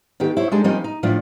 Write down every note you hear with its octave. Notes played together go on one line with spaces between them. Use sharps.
D3 D#3 B3 G4
E4 C5 C#5
G#3 D4 D#4 G4 A4
F3 G3 A#3 C4 C#4 D#4
D#4
A2 F3 D4 F4